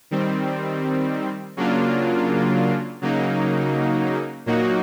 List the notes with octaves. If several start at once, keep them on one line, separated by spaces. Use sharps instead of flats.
D#3 G3 C4
C#3 F#3 A#3 D4 F4
C#3 F#3 A#3 D#4
A#2 F#3 A#3 D#4 F#4